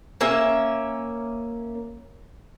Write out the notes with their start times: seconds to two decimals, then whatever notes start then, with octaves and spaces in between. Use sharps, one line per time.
0.21 A#3 C#4 E5